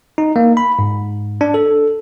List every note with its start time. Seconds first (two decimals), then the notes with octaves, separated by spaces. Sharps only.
0.18 D#4
0.36 A#3
0.57 B5
0.79 G#2
1.41 D4
1.54 A4